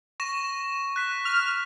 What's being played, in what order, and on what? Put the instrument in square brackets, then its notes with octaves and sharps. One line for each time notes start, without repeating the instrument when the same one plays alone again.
[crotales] C#6 A#6 E7
F#6 B6
[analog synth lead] F6